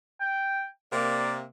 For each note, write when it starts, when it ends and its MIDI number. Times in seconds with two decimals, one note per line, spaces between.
0.20 0.65 79
0.92 1.44 48
0.92 1.44 58
0.92 1.33 74